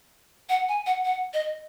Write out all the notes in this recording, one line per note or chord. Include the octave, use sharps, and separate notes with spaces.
F#5
G#5
F#5
F#5
D#5